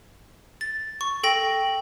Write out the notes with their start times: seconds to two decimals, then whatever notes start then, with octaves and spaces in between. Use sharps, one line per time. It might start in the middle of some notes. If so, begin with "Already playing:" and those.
0.61 A6
1.01 C#6
1.23 A4 G5 A#6